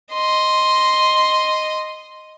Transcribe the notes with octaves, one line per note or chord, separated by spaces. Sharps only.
D#5 C6